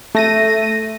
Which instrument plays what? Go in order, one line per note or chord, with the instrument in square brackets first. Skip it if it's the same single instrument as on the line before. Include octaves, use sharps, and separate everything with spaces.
[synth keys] A3 A#6 D#7